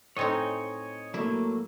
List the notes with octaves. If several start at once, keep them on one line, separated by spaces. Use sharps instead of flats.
A2 C4 D#4 C#5 D#5 G#5
F#3 A3 A#3 E4